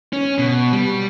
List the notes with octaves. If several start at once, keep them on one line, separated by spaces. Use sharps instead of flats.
C#4
B2
G3